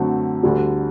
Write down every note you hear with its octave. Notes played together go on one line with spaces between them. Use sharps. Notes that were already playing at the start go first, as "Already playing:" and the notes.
Already playing: F#2 D3 A3 C4 F#4
D2 D3 G3